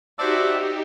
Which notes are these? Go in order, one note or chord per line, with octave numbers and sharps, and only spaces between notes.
D#4 F#4 G4 C5 D5 E5 E6